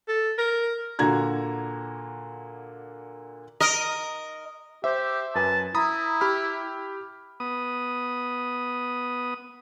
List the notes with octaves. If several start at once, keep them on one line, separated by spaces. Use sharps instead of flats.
A4
A#4
A#2 D3 F#4 A#5 G#6
A#4 D#5
G4 C5 E5
F#2 B4 G#5 A5
E4 A#5 B5 D#6
G4 B5 F6
B3 D#6